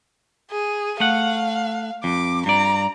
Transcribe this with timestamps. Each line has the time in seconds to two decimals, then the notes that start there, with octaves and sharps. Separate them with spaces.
0.51 G#4
1.00 A3 F5 F#5
2.04 F2 D6
2.46 G2 D5 A#5